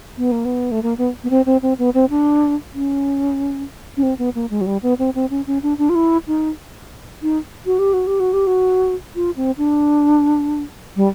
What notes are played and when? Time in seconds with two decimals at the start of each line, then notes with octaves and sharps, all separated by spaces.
0.18 B3
0.32 A#3
0.45 B3
0.71 A3
0.83 A#3
0.98 B3
1.24 B3
1.30 C4
1.46 C4
1.62 C4
1.79 B3
1.94 C4
2.10 D4
2.74 C#4
3.97 C#4
4.03 C4
4.18 B3
4.35 A#3
4.51 G#3
4.61 F#3
4.66 G3
4.83 B3
4.99 C4
5.15 C4
5.30 C#4
5.47 C#4
5.63 D4
5.78 D4
5.89 F4
5.95 E4
6.27 D#4
7.23 D#4
7.66 F#4
7.79 G4
7.93 F#4
8.07 G4
8.20 F#4
8.33 G4
8.47 F#4
9.16 F4
9.36 C4
9.58 D4
10.96 G3